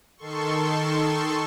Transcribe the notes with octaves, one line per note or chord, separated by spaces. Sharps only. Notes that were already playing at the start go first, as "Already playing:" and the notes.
D#3 A4 C6 C#6